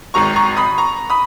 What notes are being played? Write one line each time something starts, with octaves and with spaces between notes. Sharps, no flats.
G#1 G#2 D#3 F#3 A#5 C#6
A#5 C#6
B5 D#6
A#5 C#6
B5 D#6